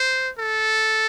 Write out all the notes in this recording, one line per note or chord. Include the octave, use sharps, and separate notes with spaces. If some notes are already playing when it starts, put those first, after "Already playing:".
Already playing: C5
A4